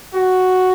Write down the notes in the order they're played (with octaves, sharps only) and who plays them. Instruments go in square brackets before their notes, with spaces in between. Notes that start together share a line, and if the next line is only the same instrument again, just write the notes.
[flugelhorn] F#4